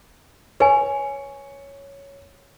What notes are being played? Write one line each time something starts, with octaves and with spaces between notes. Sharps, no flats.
B4 C#5 G#5